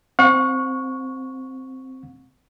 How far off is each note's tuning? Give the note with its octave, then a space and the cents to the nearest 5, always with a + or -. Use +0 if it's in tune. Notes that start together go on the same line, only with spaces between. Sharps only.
C4 +0 F#5 -45 C#6 +0